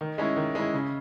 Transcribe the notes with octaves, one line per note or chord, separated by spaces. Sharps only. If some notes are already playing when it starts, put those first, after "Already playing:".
D#3
G#3 C#4 E4
D#3
G#3 C#4 E4
C#3